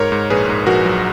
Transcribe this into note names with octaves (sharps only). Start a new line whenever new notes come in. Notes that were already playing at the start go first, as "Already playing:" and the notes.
Already playing: G#2 A#4 C#5
G#2
A#1 G#4 B4
G#2
A#1 F#4 A#4
F#3